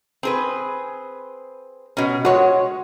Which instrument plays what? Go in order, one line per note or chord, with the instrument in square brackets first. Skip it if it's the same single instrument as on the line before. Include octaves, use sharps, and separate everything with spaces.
[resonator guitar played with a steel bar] C4 G#4 B4
B2 C#4
[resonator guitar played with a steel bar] G#3 C#5 [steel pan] F#4